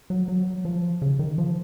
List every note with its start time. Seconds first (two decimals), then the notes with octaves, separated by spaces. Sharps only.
0.10 F#3
0.28 F#3
0.65 F3
1.02 C#3
1.19 D#3
1.38 F3